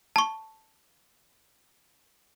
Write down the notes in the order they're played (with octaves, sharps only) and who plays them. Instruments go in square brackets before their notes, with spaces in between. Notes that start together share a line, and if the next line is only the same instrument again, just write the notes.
[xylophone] A5 C#6